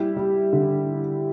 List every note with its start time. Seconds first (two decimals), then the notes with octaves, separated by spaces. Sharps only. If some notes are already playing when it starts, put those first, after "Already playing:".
Already playing: G3 E4 G4
0.17 G3
0.53 D3